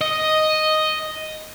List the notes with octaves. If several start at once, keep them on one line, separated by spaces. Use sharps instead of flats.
D#5